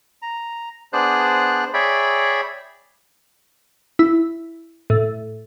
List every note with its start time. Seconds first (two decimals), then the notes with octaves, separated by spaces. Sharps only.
0.22 A#5
0.93 B3 D4 G#4 C5 D5 F#6
1.74 G#4 C#5 D5 E5 G5 B5
3.99 E4
4.90 A2